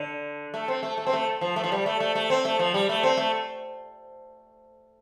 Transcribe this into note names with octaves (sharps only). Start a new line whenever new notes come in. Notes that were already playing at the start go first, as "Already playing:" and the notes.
Already playing: D3
A3
C4
A3
A3
C4
A3
F3
A3
F3
G3
A3
A3
A3
C4
A3
F3
G3
A3
C4
A3